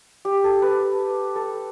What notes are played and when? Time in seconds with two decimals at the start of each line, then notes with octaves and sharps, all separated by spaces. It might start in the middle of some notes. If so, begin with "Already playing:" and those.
0.25 G4
0.44 A4
0.62 B4
1.36 A4